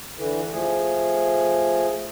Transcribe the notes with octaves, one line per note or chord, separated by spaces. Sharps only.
D3 E3
F3 A3 G#4